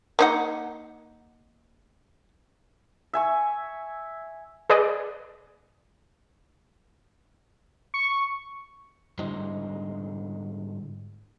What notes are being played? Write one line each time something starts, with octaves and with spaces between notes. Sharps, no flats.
A#3 D#4 F#5
E5 G#5 C#6
G#4 B4 D5 D#5
C#6
G#2 D3 G3 E4 C5 D#5